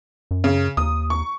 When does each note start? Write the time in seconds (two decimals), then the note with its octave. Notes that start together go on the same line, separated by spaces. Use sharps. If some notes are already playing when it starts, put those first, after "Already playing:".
0.31 F#2
0.44 C#3
0.77 D#2 D#6
1.10 C#6